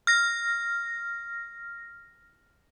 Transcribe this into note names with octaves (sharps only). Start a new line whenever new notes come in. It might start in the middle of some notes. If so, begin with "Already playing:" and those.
F6 A#6